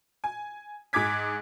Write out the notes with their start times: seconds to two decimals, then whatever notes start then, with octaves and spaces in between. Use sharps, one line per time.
0.24 G#5
0.93 G#2 G#4 D6 G#6 B6